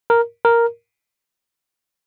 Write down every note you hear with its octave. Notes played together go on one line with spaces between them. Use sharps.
A#4
A#4